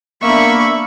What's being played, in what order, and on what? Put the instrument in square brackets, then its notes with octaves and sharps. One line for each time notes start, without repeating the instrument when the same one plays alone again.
[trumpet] A#3 [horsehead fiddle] B3 D4 [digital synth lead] E5 [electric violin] B5 C#6